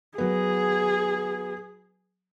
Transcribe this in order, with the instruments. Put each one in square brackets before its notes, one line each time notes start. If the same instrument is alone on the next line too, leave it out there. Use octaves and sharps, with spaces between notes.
[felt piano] F#3 B3 [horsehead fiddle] G#4